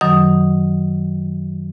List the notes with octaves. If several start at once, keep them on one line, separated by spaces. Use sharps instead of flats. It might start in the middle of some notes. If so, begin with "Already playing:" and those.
F#2 D#3 F#3 D#6